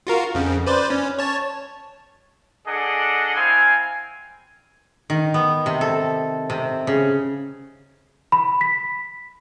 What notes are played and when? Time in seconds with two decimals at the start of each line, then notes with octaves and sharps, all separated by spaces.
0.07 F4 F#4 A#4
0.35 F2 C#3
0.67 B4 C5 D5
0.90 C#4
1.19 C#5 A5
2.67 D4 G#4 A4 D#5 F#5
3.35 C4 E4 F5 G#5
5.10 D#3
5.34 B3
5.66 C3
5.81 A4
6.50 C3
6.87 C#3
8.32 B5
8.61 B6